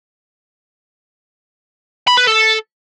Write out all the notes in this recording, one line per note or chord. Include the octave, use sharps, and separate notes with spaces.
B5
B4
A4